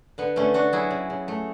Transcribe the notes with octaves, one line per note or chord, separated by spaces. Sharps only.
D3 B3
D3 A3 C#4
A3 D4 F#4
F#3 E4 G#4
C#3
C#3
A3